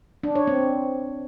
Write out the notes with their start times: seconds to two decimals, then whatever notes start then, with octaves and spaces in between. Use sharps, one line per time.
0.23 D4
0.35 C#5
0.47 C4